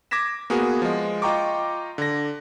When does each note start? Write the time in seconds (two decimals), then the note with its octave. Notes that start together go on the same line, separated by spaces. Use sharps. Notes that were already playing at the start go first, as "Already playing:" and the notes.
0.11 D6 G#6 A#6 B6 E7
0.50 A#3 B3 F#4 G#4
0.82 F3 G#3
1.22 F4 D#5 G5 A#5 C#6 D6
1.98 D3 A#6